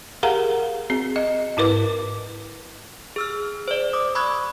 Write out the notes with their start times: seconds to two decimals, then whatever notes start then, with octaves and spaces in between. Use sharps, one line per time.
0.23 G4 G#4 A#4 F5 F#5 A#5
0.90 C4 F#4 G#4
1.16 D#5
1.57 G#2 E4 A#4 B4 D6
3.16 G#4 E6 F6
3.68 C5 D5
3.93 D6 D#6
4.15 B5 C#6 D#6 E6 F#6 G#6